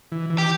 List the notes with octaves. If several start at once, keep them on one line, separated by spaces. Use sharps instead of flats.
E3
E3
G4